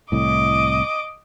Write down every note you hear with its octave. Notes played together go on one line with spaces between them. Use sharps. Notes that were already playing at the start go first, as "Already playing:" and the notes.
C2 A2 D#5 D6